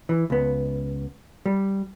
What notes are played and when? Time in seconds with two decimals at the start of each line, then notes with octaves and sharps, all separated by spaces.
0.09 E3
0.30 C#2 B3
1.46 G3